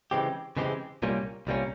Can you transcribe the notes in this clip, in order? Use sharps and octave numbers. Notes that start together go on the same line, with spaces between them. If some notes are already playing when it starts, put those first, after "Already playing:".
C#3 E3 G#3 C4 G4
C#3 E3 G#3 C4 G4
C2 A#2 G3 A#3 C#4
C2 A#2 G3 A#3 C#4